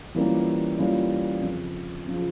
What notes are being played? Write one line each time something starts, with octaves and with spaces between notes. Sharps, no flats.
E3 G3 A#3 C#4 F4
E3 G3 A#3 C#4 F4
F2 C#3 F3
C#3 F3